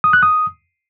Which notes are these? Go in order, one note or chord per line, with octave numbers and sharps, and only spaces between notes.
D#6
F#6
D#6